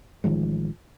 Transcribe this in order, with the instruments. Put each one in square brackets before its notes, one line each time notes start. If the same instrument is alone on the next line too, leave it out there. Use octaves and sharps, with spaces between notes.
[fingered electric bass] A1 D#3 F3 G#3